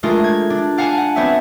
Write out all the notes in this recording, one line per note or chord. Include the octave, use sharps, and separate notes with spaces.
G#3 A3 D4 F4 A#4
G#6
D4
D5 F5 F#5 G#5 A5
F#5
B3 C4 C#5 D5 E5